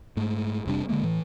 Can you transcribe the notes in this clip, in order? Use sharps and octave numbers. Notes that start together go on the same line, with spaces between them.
G#2 A3
F1 C3 G3 D4
D3 D#3 G#3 A#3
A2 E3